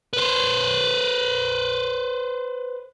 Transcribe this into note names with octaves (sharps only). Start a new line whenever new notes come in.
B4 C5